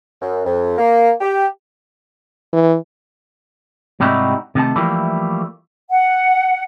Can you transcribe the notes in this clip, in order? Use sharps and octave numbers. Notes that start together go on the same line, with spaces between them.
F#2
F2
A#3
G4
E3
G#2 C3 G3 D#4 E4 F#4
C3 D#3 A3 A5
E3 F3 G3 A3 A#3 E4
F#5